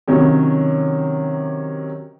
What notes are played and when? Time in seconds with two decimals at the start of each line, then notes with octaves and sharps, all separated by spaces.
0.07 C3 D#3 F#3 C#4